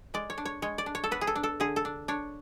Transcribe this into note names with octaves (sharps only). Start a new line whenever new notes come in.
G#3 D5
C#5
D4
C#5
G#3 C#5
D5
D4
C#5
A4
B3 B4
G#4
A4
D4
A4
D3 G#4
A4
D4
D4 C#5